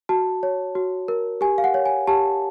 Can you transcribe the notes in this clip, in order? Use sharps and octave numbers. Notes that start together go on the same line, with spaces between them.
F#4 A5
C#5
F#4
A#4
G4 G#5
F5
F#5
C#5
G#5
G4 A5